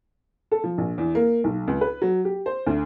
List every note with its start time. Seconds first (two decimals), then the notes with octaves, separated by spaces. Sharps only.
0.51 A4
0.64 F3
0.78 A#1
0.98 E2
1.15 A#3
1.44 B1
1.68 C#2
1.81 B4
2.02 F#3
2.25 G4
2.46 C5
2.67 D2